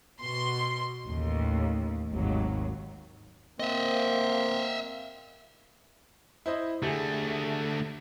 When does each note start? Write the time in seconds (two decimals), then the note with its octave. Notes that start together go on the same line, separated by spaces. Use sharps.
0.21 B2 C6
1.04 A1 D#2
2.11 G#1 D#2 F#3
3.60 A#3 C4 D#5 E5
6.46 E4 C5 D#5
6.83 D3 A3 G4 G#4